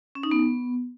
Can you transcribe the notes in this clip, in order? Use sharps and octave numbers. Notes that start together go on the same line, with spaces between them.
C#4
D#4
B3